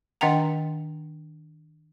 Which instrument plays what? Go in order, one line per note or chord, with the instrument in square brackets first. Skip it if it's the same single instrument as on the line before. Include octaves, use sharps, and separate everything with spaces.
[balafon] D#3 D4 D#5 F#5 G5 A#5